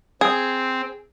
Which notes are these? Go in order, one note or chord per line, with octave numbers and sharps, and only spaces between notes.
C4 G#4